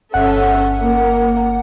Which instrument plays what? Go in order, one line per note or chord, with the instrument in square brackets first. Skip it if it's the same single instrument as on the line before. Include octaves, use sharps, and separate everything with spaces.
[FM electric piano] G1 F#5 [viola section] C#4 A4 E5
[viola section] A#3